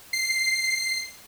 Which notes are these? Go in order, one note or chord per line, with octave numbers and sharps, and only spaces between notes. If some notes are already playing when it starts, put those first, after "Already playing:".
C7